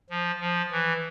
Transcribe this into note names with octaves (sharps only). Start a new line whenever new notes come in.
F3
F3
E3